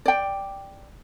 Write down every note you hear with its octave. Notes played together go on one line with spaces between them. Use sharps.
D5 G5